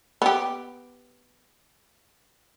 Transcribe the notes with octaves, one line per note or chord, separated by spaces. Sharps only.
B3 G4